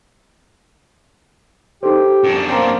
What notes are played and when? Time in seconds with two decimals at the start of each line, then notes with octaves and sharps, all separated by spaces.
1.83 D#4 G4 A4 C5
2.24 F#2 D4
2.49 A#3 C4 A#4